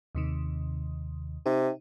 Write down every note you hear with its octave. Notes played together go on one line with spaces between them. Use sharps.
D#2 C3 D#3
C3 D#4